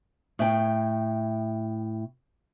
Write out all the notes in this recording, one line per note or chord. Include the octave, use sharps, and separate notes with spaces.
A2 G5